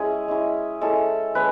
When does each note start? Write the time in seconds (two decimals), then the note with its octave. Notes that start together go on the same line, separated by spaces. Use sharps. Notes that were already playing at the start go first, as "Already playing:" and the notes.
Already playing: G#3 C#4 E4 G#4
0.28 G#3 C#4 E4
0.81 G#3 C#4 E4 A4
1.35 G#3 C#4 B4